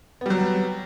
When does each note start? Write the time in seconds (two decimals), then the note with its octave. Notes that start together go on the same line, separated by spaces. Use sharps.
0.21 B3
0.26 G3
0.30 F#3